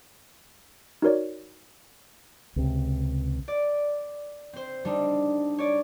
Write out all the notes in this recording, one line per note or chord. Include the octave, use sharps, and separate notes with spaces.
D#4 F#4 A#4 C#5 D5
C#2 C3
D5
C4 C5
G3 D4 D#4
C#5 D5